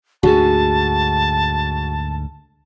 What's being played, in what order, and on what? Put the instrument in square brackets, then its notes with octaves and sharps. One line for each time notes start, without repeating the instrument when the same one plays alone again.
[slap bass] D2 G#2 D3 [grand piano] F#4 G#4 [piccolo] A5